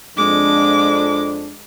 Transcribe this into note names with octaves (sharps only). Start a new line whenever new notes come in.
F2 G#3 D4 D6